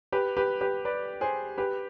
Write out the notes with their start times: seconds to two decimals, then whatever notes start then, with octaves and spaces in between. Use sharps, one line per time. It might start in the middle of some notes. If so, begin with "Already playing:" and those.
0.12 G4 B4
0.37 G4 B4
0.61 G4 B4
0.85 B4 D5
1.21 G#4 C5
1.58 G4 B4